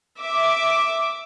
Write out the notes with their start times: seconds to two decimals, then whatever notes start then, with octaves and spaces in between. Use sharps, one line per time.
0.20 E5 D6